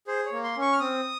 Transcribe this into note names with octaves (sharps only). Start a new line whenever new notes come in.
G#4 C5
C#5
A#3
C6
C#4 C#6
F6
C4 D#6